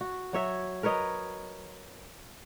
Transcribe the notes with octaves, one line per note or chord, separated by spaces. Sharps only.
F#4
F#3 C#5 E5
A#4 B4 C#5 D#5